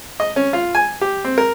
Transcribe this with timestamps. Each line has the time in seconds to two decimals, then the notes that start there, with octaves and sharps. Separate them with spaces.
0.20 D#5
0.36 C#4
0.53 F4
0.75 G#5
1.01 G4
1.25 C4
1.38 A#4